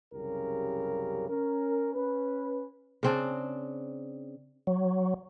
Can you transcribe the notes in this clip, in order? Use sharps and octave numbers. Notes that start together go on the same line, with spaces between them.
C2 F#2 C#3 G4 A#4
C#4 A#4
C#4 B4
C#3 C4 D4
F#3